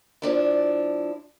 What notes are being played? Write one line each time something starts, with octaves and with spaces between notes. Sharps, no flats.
F3 D4 E4